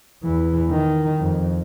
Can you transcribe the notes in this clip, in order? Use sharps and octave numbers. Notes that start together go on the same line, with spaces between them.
E2 E3
D#3
F2